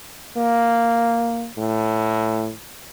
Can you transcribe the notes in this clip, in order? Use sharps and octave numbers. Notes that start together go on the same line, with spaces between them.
A#3
A2